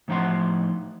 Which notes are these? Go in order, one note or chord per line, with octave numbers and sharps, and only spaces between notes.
A2 F3 D#4 E5 F#5 C6